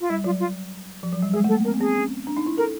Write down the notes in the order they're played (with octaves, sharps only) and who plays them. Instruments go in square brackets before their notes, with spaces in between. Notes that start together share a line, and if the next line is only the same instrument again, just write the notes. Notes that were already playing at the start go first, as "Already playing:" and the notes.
[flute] F4
[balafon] G3 [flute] E4
[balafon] F#3 [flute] F4
[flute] F4
[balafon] F3
F#3
G3
[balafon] G#3 [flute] G#4
[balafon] A3
[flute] A4
[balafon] A#3
[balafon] C4 [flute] A#4
[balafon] B3
[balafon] C4 [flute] G#4
[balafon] C#4
D4
D#4
E4
[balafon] A4 [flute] A#4